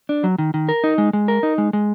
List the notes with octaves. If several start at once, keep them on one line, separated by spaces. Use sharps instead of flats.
D4
F#3
D#3
D#3
A#4
D#4
G#3
G#3
A#4
D#4
G#3
G#3